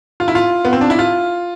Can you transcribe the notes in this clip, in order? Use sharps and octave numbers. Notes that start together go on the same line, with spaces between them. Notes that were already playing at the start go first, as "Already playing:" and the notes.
F4
E4
F4
B3
C4
D4
E4
F4